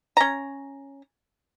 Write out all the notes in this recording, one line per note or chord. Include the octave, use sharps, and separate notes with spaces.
C#4 A#5